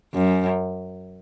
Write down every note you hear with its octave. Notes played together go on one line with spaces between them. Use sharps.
F#2